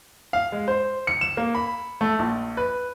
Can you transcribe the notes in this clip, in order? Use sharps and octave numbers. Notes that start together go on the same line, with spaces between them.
F5
G#3
C5
C#7
E7
A#3
B5
A3
A#1
B4